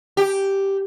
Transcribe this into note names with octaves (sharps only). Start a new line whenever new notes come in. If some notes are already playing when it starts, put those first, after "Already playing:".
G4